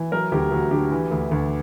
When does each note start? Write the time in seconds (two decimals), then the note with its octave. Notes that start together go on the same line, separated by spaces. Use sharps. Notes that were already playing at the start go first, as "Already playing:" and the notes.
Already playing: E3
0.12 F#3 A#4
0.32 D2 G4
0.52 D2 F#4
0.71 D3 G4
0.91 E3
1.11 D2
1.31 D2